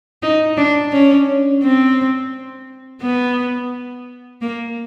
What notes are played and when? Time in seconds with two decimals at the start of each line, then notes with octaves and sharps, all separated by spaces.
0.23 D#4
0.57 D4
0.92 C#4
1.63 C4
3.02 B3
4.42 A#3